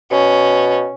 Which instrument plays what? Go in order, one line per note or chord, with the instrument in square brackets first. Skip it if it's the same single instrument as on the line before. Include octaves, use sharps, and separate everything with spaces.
[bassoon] B2 [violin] C#4